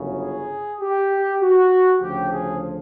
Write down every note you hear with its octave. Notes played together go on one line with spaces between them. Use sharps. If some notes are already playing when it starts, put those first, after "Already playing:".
Already playing: G1 F#2 C#3
G#4
G4
F#4
D2 C#3 F3 G4
G#4